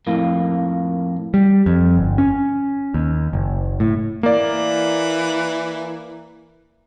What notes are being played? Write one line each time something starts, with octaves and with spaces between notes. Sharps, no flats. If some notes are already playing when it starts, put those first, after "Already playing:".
F2 A2 A#3
G3
F2
G1
C#4
D#2
F#1
A2
E3 A#3 D5